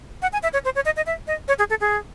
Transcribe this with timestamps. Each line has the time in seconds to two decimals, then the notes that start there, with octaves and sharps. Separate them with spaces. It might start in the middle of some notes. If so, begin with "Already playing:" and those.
0.22 F#5
0.33 G#5
0.43 E5
0.53 C#5
0.65 C5
0.75 C#5
0.85 D#5
0.97 D#5
1.06 E5
1.27 D#5
1.48 C#5
1.59 G#4
1.70 A4
1.81 G#4